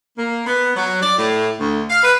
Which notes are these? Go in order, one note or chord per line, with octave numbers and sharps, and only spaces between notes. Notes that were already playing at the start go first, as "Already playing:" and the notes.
A#3
B3
F#3
D5
A2
D2
F5
B4